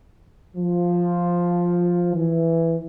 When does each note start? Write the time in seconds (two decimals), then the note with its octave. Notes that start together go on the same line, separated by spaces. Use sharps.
0.57 F3
2.14 E3